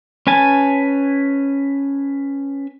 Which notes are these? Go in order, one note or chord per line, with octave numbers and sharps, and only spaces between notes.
C#4 B4 G#5 A5